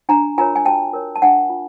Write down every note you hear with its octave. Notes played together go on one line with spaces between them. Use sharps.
D4 G#5 A#5
F4 A#4 C#5 G#5 A#5
G#5
F#4 G5 A5
A#4 C#5
A5
D4 F#5 G#5
F4